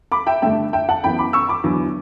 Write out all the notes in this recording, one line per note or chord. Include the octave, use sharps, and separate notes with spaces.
B5 D6
E5 G5
G2 D3 A3 E5 G5
E5 G5
F#5 A5
F#2 E3 B3 G5 B5
B5 D6
C#6 E6
B5 D6
E2 D3 F#3